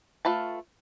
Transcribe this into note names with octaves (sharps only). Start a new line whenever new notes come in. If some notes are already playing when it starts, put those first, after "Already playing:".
A3 F4 B4 A5